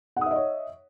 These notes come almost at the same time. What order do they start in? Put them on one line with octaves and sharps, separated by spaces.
F#5 D#6 E5 D#5 C#5